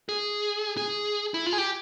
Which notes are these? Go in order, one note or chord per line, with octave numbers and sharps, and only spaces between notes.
G#4
G#4
E4
F4
G#4
G4